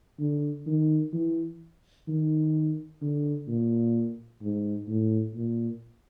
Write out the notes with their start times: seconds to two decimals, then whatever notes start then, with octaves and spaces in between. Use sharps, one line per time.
0.19 D3
0.67 D#3
1.13 E3
2.08 D#3
3.02 D3
3.48 A#2
4.42 G#2
4.88 A2
5.35 A#2